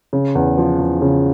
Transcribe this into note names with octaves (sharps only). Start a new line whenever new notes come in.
C#3
E2
F3
E2
C#3